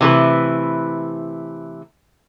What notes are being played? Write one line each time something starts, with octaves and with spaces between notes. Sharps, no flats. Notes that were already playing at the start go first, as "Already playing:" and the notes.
C3 E3 A3 B4